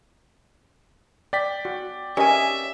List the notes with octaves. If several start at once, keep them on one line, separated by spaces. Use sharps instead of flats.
D5 G5 B6
F#4
C#4 G4 A#4 D#5 E5 G#5